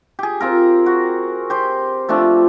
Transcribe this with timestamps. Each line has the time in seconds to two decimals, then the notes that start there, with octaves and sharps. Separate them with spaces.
0.19 G4 G#4
0.41 C4 F4 A#4
0.86 F#4
1.50 G4 C5
2.09 F3 A3 C4 D4